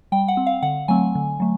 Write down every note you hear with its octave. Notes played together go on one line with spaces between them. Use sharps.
G3 G5
F#5
C4
F5
D3 F#5
F#3 A3 C4 G#5
D3
F#3 A3